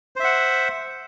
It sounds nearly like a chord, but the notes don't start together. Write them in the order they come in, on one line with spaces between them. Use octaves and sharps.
C5 E5 F#5